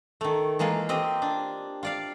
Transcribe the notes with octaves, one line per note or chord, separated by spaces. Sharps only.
D#3 A3
E3 G#3 A#3 F4
C4 G4 D#5
D4
F4 D5 F5